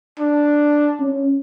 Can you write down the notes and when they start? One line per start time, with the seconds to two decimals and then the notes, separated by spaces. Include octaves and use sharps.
0.19 D4
1.00 C#4